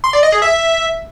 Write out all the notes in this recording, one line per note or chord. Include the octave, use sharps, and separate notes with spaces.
C6
D5
D#5
G#4
E5